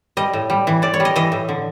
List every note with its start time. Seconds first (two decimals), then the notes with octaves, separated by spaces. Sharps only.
0.17 G3 D#5
0.33 A2
0.50 G3
0.67 E3
0.82 A2 D5
0.94 C#5
1.00 G3
1.05 D#5
1.16 E3 D#5
1.32 A2
1.49 D3